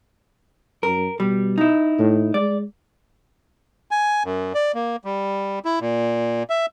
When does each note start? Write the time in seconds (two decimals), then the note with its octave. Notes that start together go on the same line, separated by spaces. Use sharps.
0.83 F#2 A#4
1.20 B2 G3
1.58 D#4 E4
1.99 A2
2.34 G#3 D5
3.91 G#5
4.25 F#2
4.55 D5
4.74 A#3
5.05 G3
5.65 E4
5.81 A#2
6.50 E5